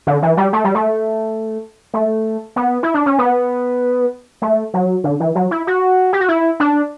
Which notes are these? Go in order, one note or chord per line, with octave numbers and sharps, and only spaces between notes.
D3
E3
G3
A3
G3
A3
A3
B3
E4
D4
C#4
B3
A3
F#3
D3
E3
F#3
E4
F#4
G4
F#4
E4
D4